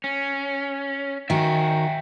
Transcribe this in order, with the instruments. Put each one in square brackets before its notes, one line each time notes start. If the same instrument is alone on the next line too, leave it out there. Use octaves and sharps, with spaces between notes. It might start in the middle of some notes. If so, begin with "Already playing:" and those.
[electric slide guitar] C#4
[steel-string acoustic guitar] D#3 F#4 [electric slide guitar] E5 G5 G#5